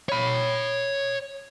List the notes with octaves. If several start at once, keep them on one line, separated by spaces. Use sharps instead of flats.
C#5 B5